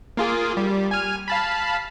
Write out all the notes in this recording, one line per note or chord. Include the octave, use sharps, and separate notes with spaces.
A#3 F4 G#4
G3
G#5 F6
F5 A5 B5